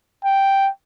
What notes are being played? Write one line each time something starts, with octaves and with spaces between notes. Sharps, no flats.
G5